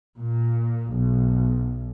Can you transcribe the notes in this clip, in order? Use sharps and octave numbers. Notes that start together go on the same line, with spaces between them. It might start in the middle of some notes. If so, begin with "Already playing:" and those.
A#2
B1